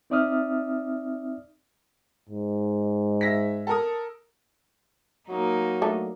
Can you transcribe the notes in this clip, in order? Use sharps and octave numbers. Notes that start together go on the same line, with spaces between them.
C4 D#4 D5 E5 D#6 F6
G#2
E5 A#6 B6
A4 A#4 D#6
F#3 A#3 D#4
A3 D4